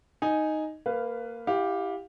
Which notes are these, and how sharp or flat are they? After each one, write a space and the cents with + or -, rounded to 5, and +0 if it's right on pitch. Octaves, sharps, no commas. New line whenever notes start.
D#4 +0 G#5 +0
A#3 -15 B4 +10 F5 +0
E4 +0 G4 +0 F5 +30